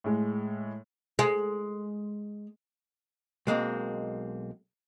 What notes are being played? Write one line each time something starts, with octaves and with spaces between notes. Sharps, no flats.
A2 G#3
G#3
B1 G#3 A#3 C4